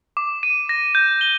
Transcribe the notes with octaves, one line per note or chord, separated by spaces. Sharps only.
D6
D#7
A#6
G6
G7